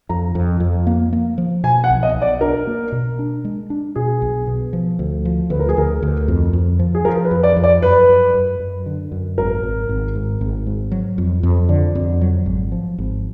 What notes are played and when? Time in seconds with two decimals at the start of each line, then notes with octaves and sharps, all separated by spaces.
0.09 F2 A#5
0.35 F2
0.60 F2
0.87 A#3
1.13 A#3
1.38 F3
1.63 B2 G#5
1.84 F#5
1.90 B1
2.03 D#5
2.15 B1
2.22 D5
2.41 D4 A#4
2.67 A#3
2.92 B2
3.19 D4
3.44 G#3
3.70 D4
3.96 B2 G#4
4.22 B1
4.47 B2
4.73 F3
4.99 D2
5.25 F3
5.50 D2 B4
5.59 A#4
5.69 G#4
5.77 D2 A#4
6.02 D2
6.28 F2
6.53 F2
6.79 F3
6.95 G#4
7.05 F3 A#4
7.25 B4
7.31 F2
7.43 D5
7.57 F2
7.64 D5
7.82 F#2 B4
8.09 F#2
8.34 F#2
8.60 F#2
8.86 D3
9.12 F#2
9.38 G#1 A#4
9.63 G#1
9.89 G#1
10.15 G#2
10.41 G#1
10.67 G#2
10.92 F#3
11.18 F2
11.43 F2
11.69 D3 D5
11.95 F2
12.21 F#3
12.46 G#1
12.72 F3
12.98 G#1